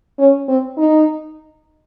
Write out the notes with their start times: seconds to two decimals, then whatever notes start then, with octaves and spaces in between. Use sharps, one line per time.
0.19 C#4
0.48 C4
0.78 D#4